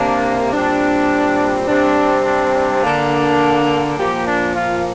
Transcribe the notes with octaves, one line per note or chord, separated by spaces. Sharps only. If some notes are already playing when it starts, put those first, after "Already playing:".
Already playing: C3 A#3 D4
A#2 G3 C4 D4
C3 G3 C4 D4
D4
D4
D3 A#3
A#2 F3 A#3 G4
D4
F4